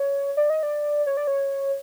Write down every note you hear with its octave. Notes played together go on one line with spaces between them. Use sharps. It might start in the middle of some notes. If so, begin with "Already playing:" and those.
Already playing: C#5
D5
D#5
D5
C#5
D5
C#5